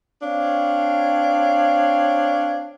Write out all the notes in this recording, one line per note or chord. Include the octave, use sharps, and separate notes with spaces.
C4 D4 C#5 F5